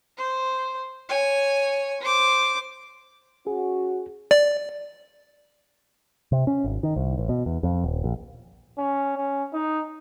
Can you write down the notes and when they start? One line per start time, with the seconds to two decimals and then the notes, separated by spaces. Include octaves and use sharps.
0.17 C5
1.09 C#5 G#5
2.01 C5 D6
3.47 C#4 F#4 G#4
4.31 D5
6.32 C3
6.47 C#4
6.64 G#1
6.83 D#3
6.96 C2
7.18 A1
7.29 B2
7.46 E2
7.63 F2
7.84 D#1
8.04 A#1
8.78 C#4
9.17 C#4
9.53 D#4